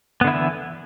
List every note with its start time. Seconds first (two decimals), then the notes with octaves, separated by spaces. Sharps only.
0.21 B3
0.24 D3
0.27 E4
0.31 E3